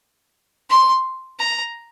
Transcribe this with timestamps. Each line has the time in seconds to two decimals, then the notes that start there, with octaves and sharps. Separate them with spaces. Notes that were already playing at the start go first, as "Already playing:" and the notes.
0.70 C6
1.39 A#5